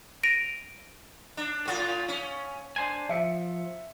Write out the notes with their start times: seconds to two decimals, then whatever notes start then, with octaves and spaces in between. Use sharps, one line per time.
0.23 A#6 D7 D#7 F7
1.37 D4
1.65 A2 F4
2.08 C#4
2.76 D4 C5 G#5
3.09 F3 E5 C#7